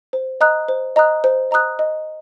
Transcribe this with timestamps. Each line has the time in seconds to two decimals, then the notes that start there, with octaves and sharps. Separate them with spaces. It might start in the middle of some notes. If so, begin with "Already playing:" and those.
0.13 C5
0.41 D#5 A#5 D#6 F#6
0.69 C5
0.96 D#5 A#5 D#6 F#6
1.24 C5
1.51 D#5 A#5 D#6 F#6
1.79 D#5